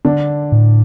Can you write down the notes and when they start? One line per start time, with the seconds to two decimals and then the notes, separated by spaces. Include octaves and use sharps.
0.05 D3 D4
0.52 A2